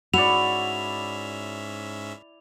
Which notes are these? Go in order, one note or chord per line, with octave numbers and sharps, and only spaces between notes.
G#2 C#4 E4 F#4 D5 E5 F7